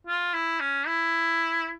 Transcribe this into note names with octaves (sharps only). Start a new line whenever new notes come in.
F4
E4
C#4
E4